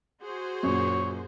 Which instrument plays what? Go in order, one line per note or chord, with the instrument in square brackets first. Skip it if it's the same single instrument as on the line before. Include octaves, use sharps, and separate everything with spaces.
[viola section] F#4 G#4 C5
[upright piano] F#2 A#2 [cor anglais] C#5